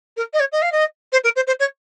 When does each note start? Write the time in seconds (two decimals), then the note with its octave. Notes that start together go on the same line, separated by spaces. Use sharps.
0.17 A#4
0.33 D#5
0.40 C#5
0.52 D#5
0.62 F5
0.72 D#5
1.12 C5
1.24 A#4
1.36 C5
1.47 C5
1.59 C#5